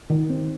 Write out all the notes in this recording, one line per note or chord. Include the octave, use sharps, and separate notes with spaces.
D#3
C4